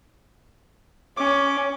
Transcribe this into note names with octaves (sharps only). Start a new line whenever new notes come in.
C#4 D6